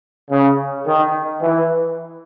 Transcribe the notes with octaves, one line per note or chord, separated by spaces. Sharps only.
C#3
D#3
E3